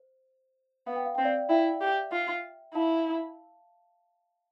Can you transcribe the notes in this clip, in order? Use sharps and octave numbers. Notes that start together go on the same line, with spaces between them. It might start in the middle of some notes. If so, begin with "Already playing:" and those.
Already playing: C5
B3 F5
G5
F5
C4 G5
D5 F5
E4 E5 G5
G4
F4
E4 F5 A5